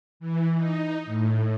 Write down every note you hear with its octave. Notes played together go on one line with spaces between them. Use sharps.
E3
D#4
A2